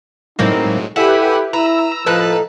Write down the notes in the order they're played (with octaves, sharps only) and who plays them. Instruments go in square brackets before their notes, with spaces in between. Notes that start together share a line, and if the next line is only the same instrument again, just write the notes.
[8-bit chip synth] A2 F#3 G#3 [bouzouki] A#3 C4 E4 [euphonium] D#4
[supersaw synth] E4 G4 B4 [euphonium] A4 [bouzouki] E5 [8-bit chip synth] F#5 G#5 B5
[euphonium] E4 [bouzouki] B4 [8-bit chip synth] A#5 [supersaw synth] E6
[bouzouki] A2 A#3 D#4 [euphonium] F3 [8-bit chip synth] B4 A5 F#6